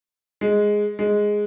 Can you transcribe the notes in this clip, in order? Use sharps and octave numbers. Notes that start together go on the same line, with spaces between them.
G#3
G#3